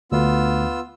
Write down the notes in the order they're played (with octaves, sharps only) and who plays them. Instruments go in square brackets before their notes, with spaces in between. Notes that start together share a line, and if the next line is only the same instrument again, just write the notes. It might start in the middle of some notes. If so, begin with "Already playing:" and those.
[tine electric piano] D2 [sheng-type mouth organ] B3 F4 E6